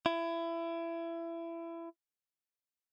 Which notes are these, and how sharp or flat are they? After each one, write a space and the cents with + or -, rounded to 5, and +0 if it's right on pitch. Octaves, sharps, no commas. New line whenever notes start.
E4 +25